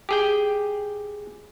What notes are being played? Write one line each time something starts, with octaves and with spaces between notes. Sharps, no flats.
G4 G#4 G5